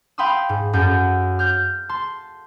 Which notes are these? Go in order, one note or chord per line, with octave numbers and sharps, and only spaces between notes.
F5 G5 B5 C6 D#6 E6
G#2
F#2 A4 G6
F6 G6
A5 C6